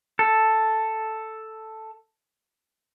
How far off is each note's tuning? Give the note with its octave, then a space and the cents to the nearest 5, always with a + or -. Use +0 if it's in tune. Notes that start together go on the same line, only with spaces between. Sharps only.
A4 +0